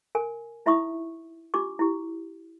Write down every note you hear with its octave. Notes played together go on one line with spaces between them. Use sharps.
A#4 G#5
D#4 E4 E5 B5 C#6 D#6
D4 F4 G4 D6
E4 G4